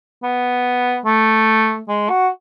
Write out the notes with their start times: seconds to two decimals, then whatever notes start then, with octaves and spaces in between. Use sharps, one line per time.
0.23 B3
1.05 A3
1.88 G#3
2.09 F#4